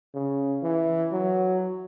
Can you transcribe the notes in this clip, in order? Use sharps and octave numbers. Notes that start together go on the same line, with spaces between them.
C#3
E3
F#3